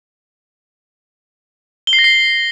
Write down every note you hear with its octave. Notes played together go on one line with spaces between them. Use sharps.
G7
C7
A#6
C7